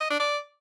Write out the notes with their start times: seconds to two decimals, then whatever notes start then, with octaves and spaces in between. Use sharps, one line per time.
0.01 D#5
0.10 D4
0.20 D5